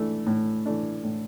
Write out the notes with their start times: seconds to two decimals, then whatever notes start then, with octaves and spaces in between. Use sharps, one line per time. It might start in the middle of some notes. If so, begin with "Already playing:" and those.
Already playing: A2 E3 A3 D4
0.27 A2
0.66 E3 A3 D4
1.04 A2